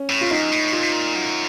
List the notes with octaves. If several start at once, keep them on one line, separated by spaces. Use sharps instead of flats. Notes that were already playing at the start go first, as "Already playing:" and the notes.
Already playing: C#4
A2
F4
F#2 D#4
A2
A#2 F4
C3
A#2
F#2